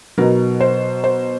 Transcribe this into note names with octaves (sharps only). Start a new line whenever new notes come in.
B2 F#3 B3 D#4 A#4
C5
C5